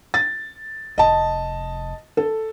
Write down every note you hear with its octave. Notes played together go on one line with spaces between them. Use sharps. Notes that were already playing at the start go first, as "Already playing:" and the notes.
A6
F1 D#5 A5
A4